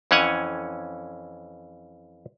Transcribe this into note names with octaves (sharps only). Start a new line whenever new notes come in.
F2 E3 C#4 C#5 F#5 G#5